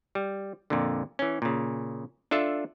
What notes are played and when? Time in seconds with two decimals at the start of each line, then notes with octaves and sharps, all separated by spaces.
0.15 G3
0.70 F2 A#2 D3
1.19 E3 C#4
1.42 A#2 C#3
2.31 D4 F4 A4 E5